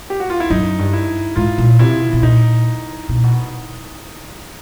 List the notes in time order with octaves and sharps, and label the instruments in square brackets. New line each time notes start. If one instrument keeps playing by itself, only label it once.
[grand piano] G4
F#4
F4
E4
[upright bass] F#2 [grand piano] D#4
[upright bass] G2
[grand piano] E4
[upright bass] G#2 [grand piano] F4
[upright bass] A#2
[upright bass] C3 [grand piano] E4
[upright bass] B2
B2
[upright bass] A#2 [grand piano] D#4
[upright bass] B2
A#2
B2